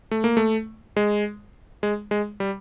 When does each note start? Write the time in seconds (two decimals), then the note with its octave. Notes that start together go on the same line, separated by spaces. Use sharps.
0.11 A3
0.24 A#3
0.37 A3
0.97 G#3
1.83 G#3
2.11 G#3
2.40 G3